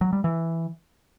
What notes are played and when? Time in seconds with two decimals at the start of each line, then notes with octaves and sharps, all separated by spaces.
0.01 F#3
0.13 G3
0.24 E3